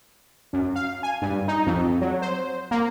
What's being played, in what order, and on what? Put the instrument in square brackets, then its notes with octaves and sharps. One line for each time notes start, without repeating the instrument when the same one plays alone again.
[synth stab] F#2
F5
G#5
G2
D#4
F2
F#3
C5
A#3